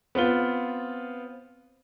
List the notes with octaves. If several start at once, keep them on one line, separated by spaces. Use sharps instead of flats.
B3 C4 F4 G7